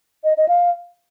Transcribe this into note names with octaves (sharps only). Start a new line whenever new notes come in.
D#5
D#5
F5